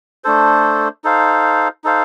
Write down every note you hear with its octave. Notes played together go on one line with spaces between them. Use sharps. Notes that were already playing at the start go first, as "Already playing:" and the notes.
A3 D4 A4 C5
D#4 A4 C5 F5
D#4 A4 C5 F5